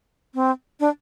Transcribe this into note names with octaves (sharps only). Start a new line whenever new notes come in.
C4
D4